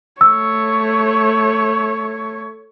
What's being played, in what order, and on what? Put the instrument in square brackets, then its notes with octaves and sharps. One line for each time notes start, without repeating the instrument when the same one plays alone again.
[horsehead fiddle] A3 C#5 [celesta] E6